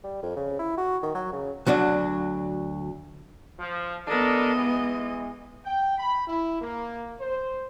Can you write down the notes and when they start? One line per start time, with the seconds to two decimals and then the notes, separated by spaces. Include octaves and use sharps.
0.04 G3
0.23 F2
0.36 C#3
0.59 E4
0.77 F#4
1.03 D#3
1.15 F#3
1.33 C#3
1.67 D2 F#3 D4 F#4
3.60 F3
4.08 B3 D4 A4 A#4 D#5
4.55 E3 G#3
5.66 G5
5.98 B5
6.28 E4
6.61 A#3
7.21 C5